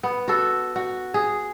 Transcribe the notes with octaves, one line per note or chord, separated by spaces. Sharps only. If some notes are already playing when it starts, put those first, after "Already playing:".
B3
F#4 A4
F#4
G#4